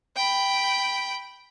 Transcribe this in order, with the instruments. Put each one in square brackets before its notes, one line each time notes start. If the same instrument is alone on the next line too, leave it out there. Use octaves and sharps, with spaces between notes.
[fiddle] G5 B5